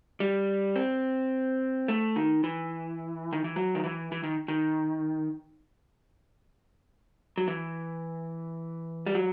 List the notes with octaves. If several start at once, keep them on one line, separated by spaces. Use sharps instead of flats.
G3
C4
A3
D#3
E3
D#3
E3
F#3
D#3
E3
E3
D#3
D#3
F#3
E3
G3
F#3